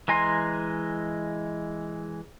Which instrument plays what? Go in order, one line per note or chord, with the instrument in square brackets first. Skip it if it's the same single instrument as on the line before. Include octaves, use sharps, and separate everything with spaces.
[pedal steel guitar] E3 G#3 G#5 A#5 C6